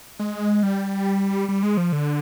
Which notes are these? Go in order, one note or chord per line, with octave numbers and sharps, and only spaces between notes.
G#3
G3
G3
G#3
F3
D3